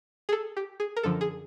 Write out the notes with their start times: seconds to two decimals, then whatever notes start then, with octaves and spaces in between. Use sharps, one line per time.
0.29 G#4
0.33 A4
0.57 G4
0.80 G#4
0.97 A#4
1.03 F#2 D3 F3 A4
1.21 G#4